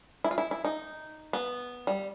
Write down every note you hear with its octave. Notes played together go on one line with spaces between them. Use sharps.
E4
F4
E4
E4
D#4
B3
G3